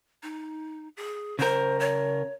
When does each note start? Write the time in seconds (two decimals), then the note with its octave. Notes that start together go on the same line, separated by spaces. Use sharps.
0.23 D#4
0.97 G#4
1.39 C#3 A#4 C5
1.80 C#5